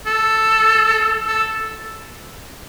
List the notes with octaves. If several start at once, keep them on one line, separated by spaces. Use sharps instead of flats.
A4
A4